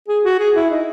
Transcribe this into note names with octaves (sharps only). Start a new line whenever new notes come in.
G#4
F#4
G#4
E4
D#4